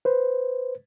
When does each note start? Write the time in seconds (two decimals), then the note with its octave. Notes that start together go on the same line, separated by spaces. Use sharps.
0.05 B4 C5